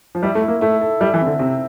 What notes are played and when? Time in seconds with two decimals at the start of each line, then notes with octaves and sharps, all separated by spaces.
0.15 F3
0.23 G3 E4
0.35 A3
0.42 E4
0.48 A#3
0.61 A3 E4
0.81 A4
1.01 G3 E4
1.14 E3
1.21 C4
1.26 D3
1.39 C3 C4